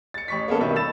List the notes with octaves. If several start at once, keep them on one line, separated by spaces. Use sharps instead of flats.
A6 C#7
A1 C#6 B6
A#3 B3 C#4 A4
G2 B2 D#3 E5 C#6
B5 E6 A6 E7